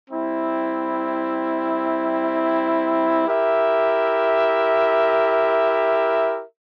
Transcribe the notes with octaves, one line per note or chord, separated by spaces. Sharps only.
G3 C4 E4
E4 G4 A#4 E5